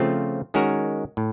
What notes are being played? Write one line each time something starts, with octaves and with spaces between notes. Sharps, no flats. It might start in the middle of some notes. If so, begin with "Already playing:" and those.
Already playing: C#3 F3 A3 C4 F4
D#3 G#3 C#4 F#4 A#4
A2